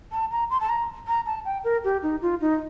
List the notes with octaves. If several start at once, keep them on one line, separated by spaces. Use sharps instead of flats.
A5
A#5
C6
A5
A#5
A#5
A5
G5
A#4
G4
D#4
F4
D#4